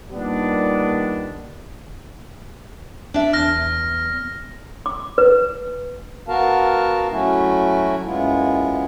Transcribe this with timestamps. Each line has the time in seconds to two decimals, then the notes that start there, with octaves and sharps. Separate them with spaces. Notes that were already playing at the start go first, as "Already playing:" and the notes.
0.12 A#2 D#3 G3 B3 D4
3.14 D4 E5
3.33 E2 F6 A#6
4.86 D6
5.18 B4
6.28 B3 F#4 A#4 F5 A5
7.11 F#3 A3 C#4 E4 F#4
8.05 F#2 G#3 B3 E4 F4